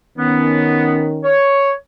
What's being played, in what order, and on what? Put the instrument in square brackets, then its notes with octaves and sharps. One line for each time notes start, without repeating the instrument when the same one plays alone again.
[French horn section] D#3 C#4 [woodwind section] B3
[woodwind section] C#5